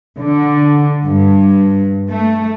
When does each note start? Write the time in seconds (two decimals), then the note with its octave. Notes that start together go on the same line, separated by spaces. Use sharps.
0.20 D3
1.04 G2
2.08 A3